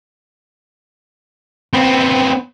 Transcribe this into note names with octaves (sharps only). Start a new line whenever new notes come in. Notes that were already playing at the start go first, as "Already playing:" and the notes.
B3 C4